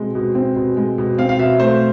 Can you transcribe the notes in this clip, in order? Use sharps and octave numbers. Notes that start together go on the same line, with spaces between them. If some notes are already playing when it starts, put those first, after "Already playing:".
Already playing: B2 G#3 C4
B2
C4
B2
G#3
B2
C4 F5
F5
B2 E5
A3 C5